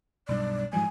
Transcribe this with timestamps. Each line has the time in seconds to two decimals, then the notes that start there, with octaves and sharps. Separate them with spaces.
0.28 B1 G2 D5
0.73 G#2 F3 G3 G#5